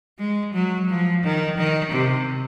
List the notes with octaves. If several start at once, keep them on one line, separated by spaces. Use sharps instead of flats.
G#3
F#3
F3
D#3
D#3
C3